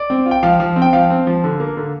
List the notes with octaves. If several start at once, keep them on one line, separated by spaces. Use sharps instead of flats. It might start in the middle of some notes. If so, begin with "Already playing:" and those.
Already playing: D5
C4
F4
G5
F3 F5
F3
C4
G5
F3 F5
C4
F3
D3
A#3
D3